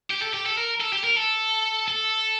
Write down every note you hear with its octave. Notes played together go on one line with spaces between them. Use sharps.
G4
A4
G4
A4
A#4
A4
G4
A#4
A4
A4